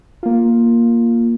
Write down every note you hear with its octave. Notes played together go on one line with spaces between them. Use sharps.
A#3 F4